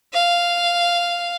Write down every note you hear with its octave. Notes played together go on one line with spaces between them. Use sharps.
F5